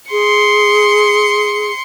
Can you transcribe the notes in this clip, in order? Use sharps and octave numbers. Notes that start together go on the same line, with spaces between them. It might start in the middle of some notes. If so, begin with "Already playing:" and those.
G#4 C6 C#7